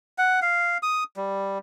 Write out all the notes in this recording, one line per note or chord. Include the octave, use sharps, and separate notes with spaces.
F#5
F5
D#6
G3